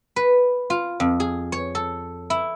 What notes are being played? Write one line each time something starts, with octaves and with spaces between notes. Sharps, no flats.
B4
F4
F2
G#4
C#5
A4
E4